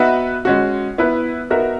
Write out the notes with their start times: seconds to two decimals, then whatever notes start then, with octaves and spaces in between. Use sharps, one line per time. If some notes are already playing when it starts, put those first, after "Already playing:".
Already playing: B3 D#4 F#4 B4 E5
0.45 G#3 C#4 F#4
0.98 B3 E4 B4
1.50 B3 D#4 F#4 A#4 E5